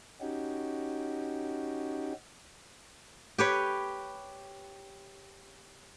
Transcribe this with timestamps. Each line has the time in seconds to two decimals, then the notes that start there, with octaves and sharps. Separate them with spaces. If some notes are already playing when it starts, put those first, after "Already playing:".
0.20 C#4 D#4 F#4 G4
3.38 G4 B4 C#5